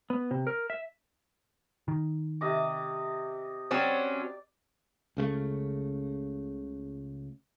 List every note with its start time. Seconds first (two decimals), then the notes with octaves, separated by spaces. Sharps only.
0.10 B3
0.31 C3
0.47 A#4
0.70 E5
1.88 D#3
2.41 C3 D#5 D6
3.71 F#3 C4 C#4 D5
5.17 C#2 C#3 G#3 A3